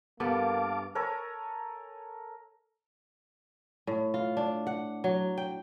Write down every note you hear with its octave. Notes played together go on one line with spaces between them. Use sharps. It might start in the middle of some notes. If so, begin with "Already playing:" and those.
G2 A#3 B3 A4 F5 A5 D6
A4 A#4 C#5 G#5
A2
F4
D4
F#5
F#3
G5